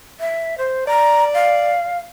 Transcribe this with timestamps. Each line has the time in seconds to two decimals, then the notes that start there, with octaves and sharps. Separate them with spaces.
0.20 E5
0.58 C5
0.87 D5 A#5
1.34 F5